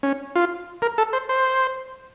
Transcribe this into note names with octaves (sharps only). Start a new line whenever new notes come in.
C#4
F4
A#4
A4
C5
C5